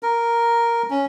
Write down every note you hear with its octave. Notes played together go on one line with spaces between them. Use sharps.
A#4
C#4